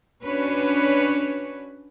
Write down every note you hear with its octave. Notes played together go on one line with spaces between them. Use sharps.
C#4 D4 F#4 B4 C#5